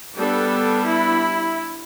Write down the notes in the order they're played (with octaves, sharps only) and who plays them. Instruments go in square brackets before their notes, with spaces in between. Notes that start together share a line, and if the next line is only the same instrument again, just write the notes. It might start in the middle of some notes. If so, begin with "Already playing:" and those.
[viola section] G3 B3 D4 A4
E4